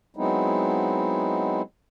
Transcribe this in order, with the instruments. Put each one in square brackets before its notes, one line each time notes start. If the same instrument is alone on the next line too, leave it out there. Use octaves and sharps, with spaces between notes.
[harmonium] F#3 G#3 B3 C4 D#4 E4